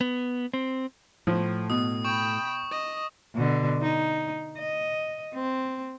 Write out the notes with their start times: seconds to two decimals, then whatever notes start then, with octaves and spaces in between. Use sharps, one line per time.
0.01 B3
0.54 C4
1.27 A2 F3
1.70 B2 D#6
2.05 G5 B5 C#6
2.71 D#5
3.36 B2 D3
3.82 D#4
4.58 D#5
5.35 C4